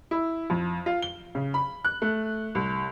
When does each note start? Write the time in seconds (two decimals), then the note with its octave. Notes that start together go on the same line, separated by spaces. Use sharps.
0.11 E4
0.50 F2
0.86 F4
1.02 G7
1.35 C#3
1.54 B5
1.85 F#6
2.02 A3
2.55 C2